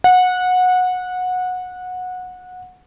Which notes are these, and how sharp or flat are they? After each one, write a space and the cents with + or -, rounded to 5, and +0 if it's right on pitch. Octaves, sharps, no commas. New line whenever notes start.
F#5 -20